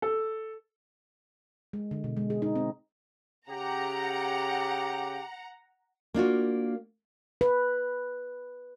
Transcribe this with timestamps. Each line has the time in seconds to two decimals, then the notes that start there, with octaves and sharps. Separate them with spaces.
0.02 A4
1.73 G#3
1.91 D3
2.04 B2
2.17 G#3
2.30 G#4
2.42 D#4
2.56 C4
3.49 C#3 G4 F#5 A#5
6.14 A#3 D4 F4 F#4
7.41 B4